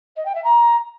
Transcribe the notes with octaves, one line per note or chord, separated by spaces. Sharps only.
D#5
G5
E5
A#5